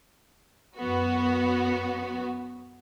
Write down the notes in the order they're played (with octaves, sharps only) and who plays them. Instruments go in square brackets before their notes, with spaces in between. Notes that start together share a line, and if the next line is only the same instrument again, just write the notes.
[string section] F#2 B3 F#4